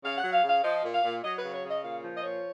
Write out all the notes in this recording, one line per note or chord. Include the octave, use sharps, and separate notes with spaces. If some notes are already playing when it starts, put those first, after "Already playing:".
C#3 F5
F#3 F#5
F5
C#3
F5
F3 D#5
A#2
F5
A#2
F#3 D#5
B4
C#3
C#5
C#3
D#5
A#2 F5
F3
D#5
A#2 C#5